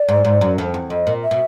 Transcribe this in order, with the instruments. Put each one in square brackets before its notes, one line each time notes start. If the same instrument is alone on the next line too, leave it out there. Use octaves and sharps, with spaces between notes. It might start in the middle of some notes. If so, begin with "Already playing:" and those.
Already playing: [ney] D5
[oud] G#2
G#2
F#2
F2
E2
[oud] F2 [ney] D#5
[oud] A#2
[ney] E5
[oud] B2